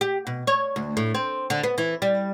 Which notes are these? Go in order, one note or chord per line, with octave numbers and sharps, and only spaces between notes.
G4
B2
C#5
D2
A2
C4
D3
B3
E3
G3